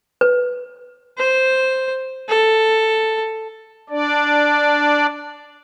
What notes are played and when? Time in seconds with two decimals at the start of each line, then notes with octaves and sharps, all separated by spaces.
0.21 B4
1.18 C5
2.28 A4
3.90 D4 D5